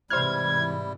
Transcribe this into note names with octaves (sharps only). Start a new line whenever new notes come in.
G#2 C3 E3 G3 E4 C5 F6 G#6